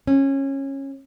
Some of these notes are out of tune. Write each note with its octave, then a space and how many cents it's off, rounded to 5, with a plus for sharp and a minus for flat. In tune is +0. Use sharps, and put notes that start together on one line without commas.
C#4 -20